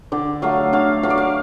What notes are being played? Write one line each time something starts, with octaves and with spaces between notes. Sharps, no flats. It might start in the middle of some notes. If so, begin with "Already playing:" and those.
D3 D5
F#3 A3 F5
D3 F5
F#3 A3 F5
D5
F5